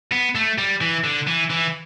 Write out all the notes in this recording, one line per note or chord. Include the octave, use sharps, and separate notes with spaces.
B3
A3
G3
E3
D3
E3
E3